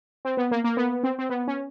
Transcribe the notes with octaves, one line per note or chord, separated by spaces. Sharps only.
C4
B3
A#3
A#3
B3
C4
C4
B3
C#4